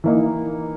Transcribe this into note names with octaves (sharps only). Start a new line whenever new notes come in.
E3 A#3 D#4